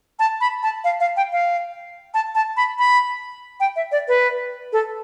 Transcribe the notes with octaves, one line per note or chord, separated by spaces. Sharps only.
A5
B5
A5
F5
F5
G5
F5
A5
A5
B5
B5
G5
E5
D5
B4
A4